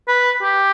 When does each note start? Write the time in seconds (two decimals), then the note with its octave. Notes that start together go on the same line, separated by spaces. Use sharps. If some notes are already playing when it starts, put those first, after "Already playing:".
0.08 B4
0.42 G4